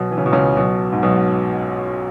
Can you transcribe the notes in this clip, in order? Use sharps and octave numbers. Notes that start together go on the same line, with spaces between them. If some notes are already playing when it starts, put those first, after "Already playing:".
Already playing: B1 B2
E3
C#3
B2
C#2 C#3
B1 B2
G#2
B1 B2